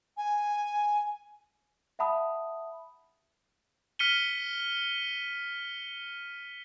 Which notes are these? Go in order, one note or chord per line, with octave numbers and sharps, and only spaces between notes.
G#5
E5 F#5 A5 B5 D#6
F6 B6 C#7 D#7 G7